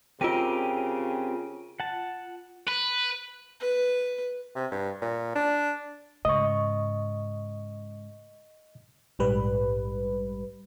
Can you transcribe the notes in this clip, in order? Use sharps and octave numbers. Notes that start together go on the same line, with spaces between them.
C#3 C4 F4 G4 A#4 D7 D#7
F#5 A5
B4
B4
C3
G2
A#2
D4
G#2 C#3 D#5 C#6
A#1 G#2 G3 B4